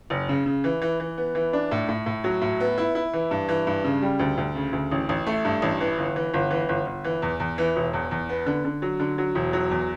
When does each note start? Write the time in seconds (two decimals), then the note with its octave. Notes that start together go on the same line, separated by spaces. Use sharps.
0.10 F#1
0.29 C#3
0.46 C#3
0.64 E3
0.82 E3
1.00 E3
1.18 B3
1.35 E3
1.53 D4
1.71 A2
1.89 A2
2.06 A2
2.24 F#3
2.41 A2
2.60 B3
2.78 E4
2.95 E4
3.13 E3
3.31 G2
3.49 E3
3.67 G2
3.84 C#3
4.02 G3
4.19 D2
4.37 D2
4.55 C#3
4.73 D2
4.91 A1
5.09 A1
5.26 A3
5.45 G2
5.62 A1
5.80 E3
5.98 G1
6.16 E3
6.34 G1
6.51 E3
6.69 G1
6.86 G1
7.04 E3
7.22 E2
7.40 E2
7.58 E3
7.76 E1
7.93 E2
8.11 E2
8.29 B3
8.46 D3
8.65 D3
8.82 F#3
9.00 D3
9.18 F#3
9.35 E1
9.53 F#3
9.71 E2